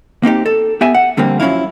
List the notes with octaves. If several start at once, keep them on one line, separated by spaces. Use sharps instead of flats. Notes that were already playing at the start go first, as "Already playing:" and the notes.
A#3 C4 D#4 G4
A4
B3 G4 E5 G#5
F#5
F2 D3 G3 A#3 C4
F#2 F3 C#4 D#4 E4 F5